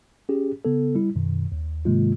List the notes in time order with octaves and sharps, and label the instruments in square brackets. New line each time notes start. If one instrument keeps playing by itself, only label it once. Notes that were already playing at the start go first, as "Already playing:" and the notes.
[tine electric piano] C#4 G4 G#4
C#3 B3 A4
G3 E4
F#2 B2 D#3
D#2
G#2 C3 D#3 G#3 A#3 F4